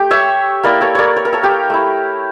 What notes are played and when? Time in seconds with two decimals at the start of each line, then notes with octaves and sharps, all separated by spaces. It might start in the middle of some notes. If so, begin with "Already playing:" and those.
Already playing: A3 G4
0.11 C#5 E5
0.63 A#3 E4 A#4 D5
0.81 A4 C#5
0.95 A#4 C#5 D5
1.16 C#5
1.25 A#4
1.33 A4 C#5
1.43 G4 A#4
1.70 A3 E4